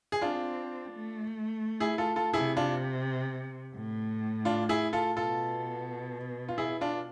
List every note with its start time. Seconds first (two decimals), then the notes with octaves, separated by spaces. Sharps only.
0.12 G#4
0.21 C4 D4 F4
0.92 A3
1.80 E4 G#4
1.98 F4 A4
2.16 F4 A4
2.33 C3 E4 G#4
2.57 D4 F4
3.75 A2
4.45 D4 F4
4.69 E4 G#4
4.93 F4 A4
5.17 B2 F4 A4
6.49 F4
6.58 E4 G#4
6.81 D4 F4